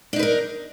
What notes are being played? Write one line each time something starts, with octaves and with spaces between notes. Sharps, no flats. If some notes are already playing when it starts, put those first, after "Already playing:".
D4 D#4 A#4 B4